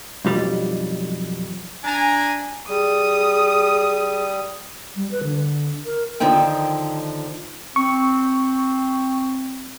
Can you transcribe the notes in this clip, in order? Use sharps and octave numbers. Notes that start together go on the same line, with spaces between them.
B1 F2 G3
D4 G#5 A#5
G3 G#4 D#6
G3
B4
D3
A#4
D#2 D3 D#3 F3 D#4 G5
C4 C#6